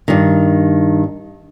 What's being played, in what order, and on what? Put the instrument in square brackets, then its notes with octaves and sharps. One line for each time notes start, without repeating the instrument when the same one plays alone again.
[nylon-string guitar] G2 D#3